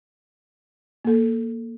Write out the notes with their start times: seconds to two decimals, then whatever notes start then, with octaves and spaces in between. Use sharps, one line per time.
1.05 A#3 A4